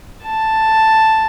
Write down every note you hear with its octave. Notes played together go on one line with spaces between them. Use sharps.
A5